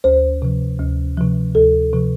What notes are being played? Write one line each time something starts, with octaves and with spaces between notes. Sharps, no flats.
D2 C5
C3 F3
D2
C3 F3
D2 A4
C3 F3